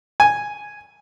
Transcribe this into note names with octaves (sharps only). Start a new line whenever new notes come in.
G#5